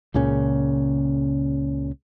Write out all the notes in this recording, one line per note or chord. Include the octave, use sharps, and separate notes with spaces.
C#2 A#2 C#3 C#4